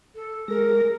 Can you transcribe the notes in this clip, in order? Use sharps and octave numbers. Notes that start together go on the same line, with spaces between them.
A4
G#3 G#4 A#4 A#6